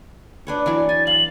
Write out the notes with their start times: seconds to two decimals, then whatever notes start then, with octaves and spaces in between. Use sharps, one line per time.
0.47 D4 B4 C#5
0.66 E3 F#3 D5
0.89 G#5 A6
1.07 F5 F#7